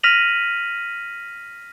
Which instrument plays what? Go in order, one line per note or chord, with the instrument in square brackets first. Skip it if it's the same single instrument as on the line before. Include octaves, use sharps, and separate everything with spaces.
[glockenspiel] F6 A#6 B6 D#7 F7 F#7